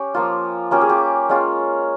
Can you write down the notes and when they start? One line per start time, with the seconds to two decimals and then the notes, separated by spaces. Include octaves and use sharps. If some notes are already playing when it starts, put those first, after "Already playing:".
Already playing: C#4 G4
0.14 F3 A#3 F4
0.71 A#3 C#4 F4 G4
0.81 G#4
0.89 G4
1.29 G#3 C#4 F4